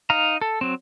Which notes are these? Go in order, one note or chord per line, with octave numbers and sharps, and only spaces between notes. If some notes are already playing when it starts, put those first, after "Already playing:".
D#4 F5 A#5
A4
F#3 C4